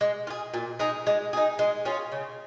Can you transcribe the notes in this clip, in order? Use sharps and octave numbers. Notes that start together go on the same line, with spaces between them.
G#3
F4
G#4
A#2
G#3 D#4 G#4
G#3
D#4 G#4
G#3
C#4 F4 G#4
C#3